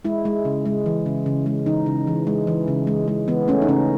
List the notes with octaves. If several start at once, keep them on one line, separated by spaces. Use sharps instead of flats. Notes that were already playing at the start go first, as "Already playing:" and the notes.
G#3 E4
G#3
C#3
G#3
E3
C#3
C#3
G#3
E3 D#4
C#3
E3
G#3
E3
C#3
G#3
G#3
E3 B3
A3 C#4
D#4
C#3 C#4